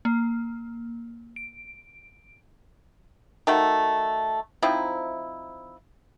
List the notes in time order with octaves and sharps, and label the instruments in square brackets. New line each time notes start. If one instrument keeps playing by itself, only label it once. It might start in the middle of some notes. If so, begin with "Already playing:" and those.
[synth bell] A#3
D7
[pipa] D#3 A3 F#4 A4
F3 C4 D#4 E4